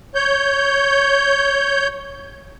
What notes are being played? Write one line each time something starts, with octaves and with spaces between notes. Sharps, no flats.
C#5 G6